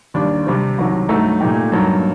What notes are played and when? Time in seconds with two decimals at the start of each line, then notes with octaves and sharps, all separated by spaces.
0.14 D#2 D#3 G3 D4
0.46 C3 G3 C4
0.78 C2 C3 D#3 F#3
1.09 G2 F#3 A3 D#4 A4
1.41 A#2 A3 D#4 G4
1.72 G2 F#3 A#3 D#4